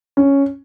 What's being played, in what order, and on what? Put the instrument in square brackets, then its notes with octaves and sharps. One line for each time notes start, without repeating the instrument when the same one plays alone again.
[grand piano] C#4